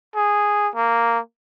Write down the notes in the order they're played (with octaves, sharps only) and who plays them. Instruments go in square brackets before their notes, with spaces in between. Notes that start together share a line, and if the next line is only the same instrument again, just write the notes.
[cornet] G#4
A#3